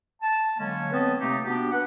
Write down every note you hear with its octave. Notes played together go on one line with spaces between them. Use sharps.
A5
D3 F#3 G#3 A#3 C#4
B3 C4 B4 C#5 D#5 A5
C3 A3 A#3 C4 D#4 G4
B3 D4 F#4 G4
B4 F#5